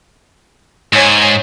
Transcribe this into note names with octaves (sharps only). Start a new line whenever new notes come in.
G#2 C#5 G#5